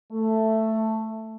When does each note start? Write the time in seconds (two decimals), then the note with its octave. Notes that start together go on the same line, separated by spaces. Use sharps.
0.12 A3